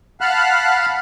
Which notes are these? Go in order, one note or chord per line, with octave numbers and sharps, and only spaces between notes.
F5 F#5 A5 B5 F6 F#6